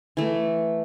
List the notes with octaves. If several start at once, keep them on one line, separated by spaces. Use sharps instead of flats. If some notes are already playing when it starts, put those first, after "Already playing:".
E3 A3